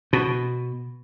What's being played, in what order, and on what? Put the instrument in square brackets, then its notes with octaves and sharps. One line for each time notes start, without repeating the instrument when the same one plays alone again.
[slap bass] B2